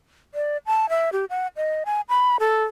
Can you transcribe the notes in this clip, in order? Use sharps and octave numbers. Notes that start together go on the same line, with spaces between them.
D5
A5
E5
G4
F#5
D#5
G#5
B5
A4